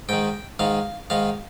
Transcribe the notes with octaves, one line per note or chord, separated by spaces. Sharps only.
G#2 D#3 G5
G#2 D#3 F5
G#2 D#3 F5